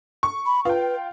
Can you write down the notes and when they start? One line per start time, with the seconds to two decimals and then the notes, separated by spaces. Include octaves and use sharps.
0.23 C#6
0.46 B5
0.65 F4 B4 G5